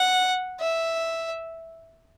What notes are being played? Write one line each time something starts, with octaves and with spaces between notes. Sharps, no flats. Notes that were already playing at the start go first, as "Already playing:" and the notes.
Already playing: F#5
E5